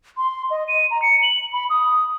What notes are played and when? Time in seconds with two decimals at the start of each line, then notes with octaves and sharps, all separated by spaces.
0.17 C6
0.51 D#5
0.68 D#7
0.91 A#5
1.02 C#7
1.23 F#7
1.53 B5
1.70 D#6